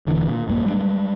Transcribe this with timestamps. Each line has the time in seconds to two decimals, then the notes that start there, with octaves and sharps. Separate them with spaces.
0.07 D#1 D#2 D3 E3
0.28 A#2
0.48 A#1 G2 G3 A#3
0.66 G3 G#3 A#3 D4